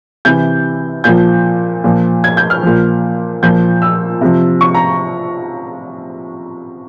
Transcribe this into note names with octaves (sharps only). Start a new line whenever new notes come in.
C3 E3 G6
A#2 F3 G6
A#2 F3
G#6
G6
F6
A#2 F3
A#2 F3 G6
E6
C3 F3
C#6
A#5